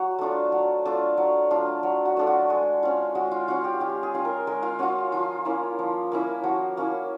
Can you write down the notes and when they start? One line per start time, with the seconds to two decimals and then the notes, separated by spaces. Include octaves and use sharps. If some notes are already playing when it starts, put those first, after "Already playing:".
Already playing: F#3 F#4
0.18 A3 D4 F4
0.52 F#3
0.85 A3 D4 F4
1.18 F#3
1.50 A3 D4 F4
1.83 F#3
2.05 F#4
2.17 A3 D4 F4
2.27 F#4
2.50 G#3
2.83 C#4 F4
3.15 G#3 F#4
3.31 F4
3.48 C#4 F4 F#4
3.64 G4
3.80 G#3 G4
4.03 G#4
4.14 C#4 F4
4.25 A#4
4.47 G#3 A#4
4.63 F4
4.79 C#4 F4 F#4
5.12 F3 F4
5.45 A#3 C#4 E4
5.79 F3
6.12 A#3 C#4 E4
6.44 F3 F#4
6.77 A#3 C#4 E4